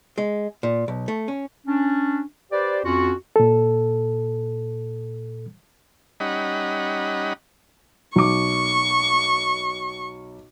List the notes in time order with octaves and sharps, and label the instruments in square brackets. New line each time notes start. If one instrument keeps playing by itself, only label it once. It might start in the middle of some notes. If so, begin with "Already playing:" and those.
[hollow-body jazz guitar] G#3
A#2
B1
A3
C#4
[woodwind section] C#4 D4
G4 B4 C5 D5
F2 C#4 F4 F#4
[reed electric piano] A#2 A4
[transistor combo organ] G3 C#4 D#4 D#5 F#5 B5
[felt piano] B1 D6 [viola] C#6